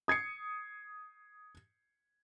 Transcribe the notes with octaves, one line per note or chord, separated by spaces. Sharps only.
D#6 G#6 C7 C#7